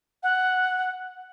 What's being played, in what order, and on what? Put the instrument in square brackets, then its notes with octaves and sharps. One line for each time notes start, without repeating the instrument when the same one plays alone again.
[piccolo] F#5